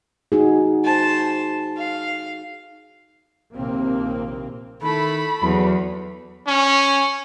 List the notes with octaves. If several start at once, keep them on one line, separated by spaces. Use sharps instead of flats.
D#4 F#4 G#4
C5 A5
F5
A#1 D#2 C3 A#3 C4
D#3 A3 E4 B5
E2 F#3
C#4